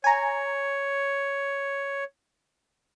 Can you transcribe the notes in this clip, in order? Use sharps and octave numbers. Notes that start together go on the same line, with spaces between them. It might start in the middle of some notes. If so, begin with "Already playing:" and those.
C#5 G#5 A#5